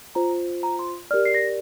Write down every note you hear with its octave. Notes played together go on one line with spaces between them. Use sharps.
F4 C5 A#5
A#5
C6
G4 A#4 D5 F6
C7
A#6